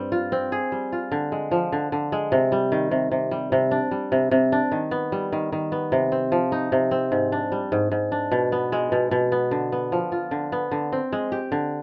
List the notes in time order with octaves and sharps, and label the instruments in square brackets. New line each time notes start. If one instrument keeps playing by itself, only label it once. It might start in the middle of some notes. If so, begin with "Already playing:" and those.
Already playing: [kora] G2 G3 C4
F4
C4
G#4
G3
F4
D3
G#3
F3
D3
D3
G#3
C3
G3
D#3
C3
C3
G3
C3
D4
G3
C3
C3
D4
D#3
B3
G3
D#3
D#3
B3
C3
C4
F3
D#4
C3
C4
G#2
D4
G3
G#2
G#2
D4
B2
B3
G#3
B2
B2
B3
D3
B3
F3
F4
D3
B3
D3
C4
G#3
G4
D3